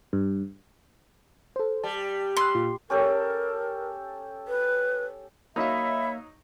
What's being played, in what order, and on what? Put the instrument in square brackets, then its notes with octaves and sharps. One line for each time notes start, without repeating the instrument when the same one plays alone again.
[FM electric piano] G2
A4 C5
[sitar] G3 [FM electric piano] A5
[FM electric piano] B5 E6 F#6 [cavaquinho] C6
[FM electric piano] A#2 F4
[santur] C#4 G4 A4 [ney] A#4
[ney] B4
[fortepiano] F#3 D#4 [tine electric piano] A#3 F5 [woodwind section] C#5 E5 [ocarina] B5